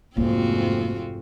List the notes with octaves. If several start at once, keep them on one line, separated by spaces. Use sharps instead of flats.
F1 G#2 A#3 C4 C#4 F4 F#4